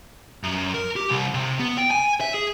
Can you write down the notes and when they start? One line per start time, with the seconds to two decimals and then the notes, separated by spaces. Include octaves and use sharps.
0.43 F#2
0.74 A#4
0.96 G4
1.11 C2
1.34 C3
1.59 B3
1.78 G5
1.91 G#5
2.21 E5
2.34 G#4